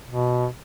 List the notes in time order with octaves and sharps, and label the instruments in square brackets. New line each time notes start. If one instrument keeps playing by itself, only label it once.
[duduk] B2